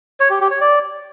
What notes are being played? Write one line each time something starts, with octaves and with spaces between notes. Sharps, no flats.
C#5
G4
G4
C#5
D5